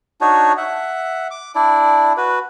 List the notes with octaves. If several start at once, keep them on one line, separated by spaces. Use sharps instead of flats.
D4 D#4 F#4 C#5
E5 F#5
D6
D4 E4 D5
F#4 B4